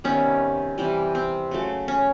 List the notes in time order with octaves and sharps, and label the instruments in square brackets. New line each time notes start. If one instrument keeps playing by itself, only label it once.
[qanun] C3 D#3 G3 B3 C#4
C3 E3 G3
C4
C#3 F#3 A3
C#4